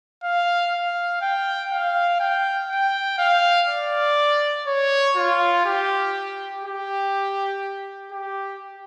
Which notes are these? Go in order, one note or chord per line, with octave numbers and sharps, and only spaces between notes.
F5
F5
G5
F5
G5
G5
F5
D5
C#5
F4
G4
G4
G4